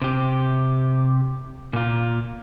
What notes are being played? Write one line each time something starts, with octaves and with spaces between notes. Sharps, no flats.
C3 G4
A#2 F4